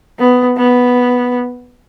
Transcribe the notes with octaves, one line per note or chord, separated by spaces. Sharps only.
B3
B3